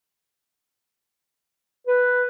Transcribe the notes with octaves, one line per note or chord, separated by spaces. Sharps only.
B4